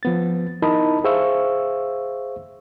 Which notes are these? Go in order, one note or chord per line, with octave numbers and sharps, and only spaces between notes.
F3 B3 A6
D#4 E4 A#4 D#5 A5 B5
G#4 C5 E5 F5 C#6 E6